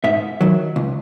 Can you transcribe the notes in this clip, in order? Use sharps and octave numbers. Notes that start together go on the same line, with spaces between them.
G#2 E5
D#3 F#3
C#2